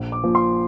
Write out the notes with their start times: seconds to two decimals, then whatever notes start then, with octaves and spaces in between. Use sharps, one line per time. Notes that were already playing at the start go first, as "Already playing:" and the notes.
Already playing: A#1
0.12 D6
0.24 A#2 F3
0.35 C6